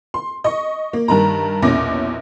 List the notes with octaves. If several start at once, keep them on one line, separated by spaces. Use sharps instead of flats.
C6
D#5 C#6
A#3
G2 D#3 A#5
A#1 E2 B2 C#4 D6 A#6